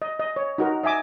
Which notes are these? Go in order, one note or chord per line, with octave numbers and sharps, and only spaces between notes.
D#5
D#5
C#5
D#4 F#4 A#4
D#5 E5 G#5 D6